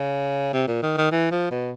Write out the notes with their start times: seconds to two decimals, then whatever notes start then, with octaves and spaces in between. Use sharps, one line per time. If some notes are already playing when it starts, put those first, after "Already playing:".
Already playing: C#3
0.53 C3
0.68 A#2
0.83 D#3
0.98 D#3
1.11 E3
1.31 F3
1.51 B2